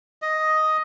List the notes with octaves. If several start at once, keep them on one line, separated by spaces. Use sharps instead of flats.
D#5